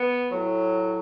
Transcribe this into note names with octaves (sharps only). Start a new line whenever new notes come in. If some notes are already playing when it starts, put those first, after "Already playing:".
Already playing: B3
A2 F#3